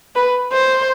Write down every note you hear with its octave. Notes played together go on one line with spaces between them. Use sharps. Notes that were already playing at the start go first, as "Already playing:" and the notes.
B4
C5